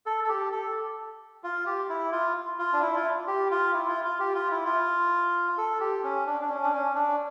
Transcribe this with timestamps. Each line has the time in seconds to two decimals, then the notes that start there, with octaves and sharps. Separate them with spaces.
0.06 A4
0.24 A4
0.29 G4
0.52 A4
1.43 F4
1.66 G4
1.89 E4
2.12 F4
2.59 F4
2.73 D4
2.82 E4
2.96 F4
3.27 G4
3.51 F4
3.74 E4
3.88 F4
4.04 F4
4.19 G4
4.35 F4
4.51 E4
4.65 F4
5.58 A4
5.80 G4
6.03 C#4
6.27 D4
6.41 D4
6.49 C#4
6.64 D4
6.72 C#4
6.95 D4